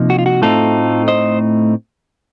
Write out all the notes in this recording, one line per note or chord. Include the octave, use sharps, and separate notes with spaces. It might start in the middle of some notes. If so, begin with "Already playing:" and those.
Already playing: C3 F3 A#3 D#4
F#4
F4
F#4
A2 A3 C4 D#4 F4 A4
C5 D#5